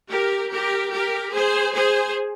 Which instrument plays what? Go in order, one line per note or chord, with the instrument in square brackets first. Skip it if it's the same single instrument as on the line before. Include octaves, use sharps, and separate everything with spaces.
[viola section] G4 A#4
G4 A#4
G4 A#4
G#4 C5
G#4 C5